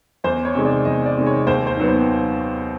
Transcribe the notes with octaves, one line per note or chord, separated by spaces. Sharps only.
E2 C5
C#5
C3 D#3 G#3
D5
E2 D#5
D5
C3 D#3 G#3
C#5
D#2 C5
C5
D#3 F#3 B3
C5